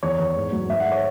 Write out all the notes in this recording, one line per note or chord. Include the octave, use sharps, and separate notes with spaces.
E2 C#5
E2
G#2
F#3
G#2 E5
F#5
C#5